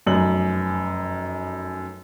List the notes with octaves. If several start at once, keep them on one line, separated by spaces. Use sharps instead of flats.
F1 F#2 F#7